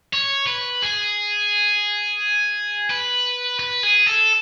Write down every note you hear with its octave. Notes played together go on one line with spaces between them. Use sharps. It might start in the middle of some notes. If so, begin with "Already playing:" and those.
C#5
B4
G#4
B4
B4
G#4
A4